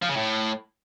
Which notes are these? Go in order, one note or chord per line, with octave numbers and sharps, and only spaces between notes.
F3
C#3
A2